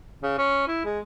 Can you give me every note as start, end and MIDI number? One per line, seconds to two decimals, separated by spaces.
0.22 0.34 49
0.38 0.64 61
0.68 0.82 64
0.85 1.00 56